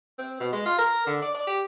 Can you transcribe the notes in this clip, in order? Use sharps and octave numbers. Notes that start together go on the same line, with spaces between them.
C4
B2
G#3
F4
A#4
D3
D5
D5
G4